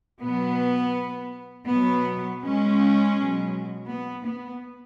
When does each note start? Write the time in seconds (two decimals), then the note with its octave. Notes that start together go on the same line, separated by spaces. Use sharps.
0.23 B2 F#3 B3
1.70 B2 F#3 B3
2.43 G#3 C#4
3.17 B2 F#3
3.90 B3
4.27 B3